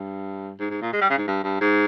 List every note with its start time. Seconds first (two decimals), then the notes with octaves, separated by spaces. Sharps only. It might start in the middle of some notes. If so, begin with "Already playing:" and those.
Already playing: G2
0.59 G#2
0.70 G#2
0.82 A#2
0.93 G#3
1.01 G3
1.10 C#3
1.18 G#2
1.27 G2
1.44 G2
1.61 G#2